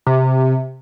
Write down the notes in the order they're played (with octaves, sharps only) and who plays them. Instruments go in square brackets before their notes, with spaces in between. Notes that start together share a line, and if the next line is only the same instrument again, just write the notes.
[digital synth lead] C3